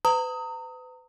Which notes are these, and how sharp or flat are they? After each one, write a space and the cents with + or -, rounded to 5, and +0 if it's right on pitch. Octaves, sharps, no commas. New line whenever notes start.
B4 +35 A#5 -30 D#6 +20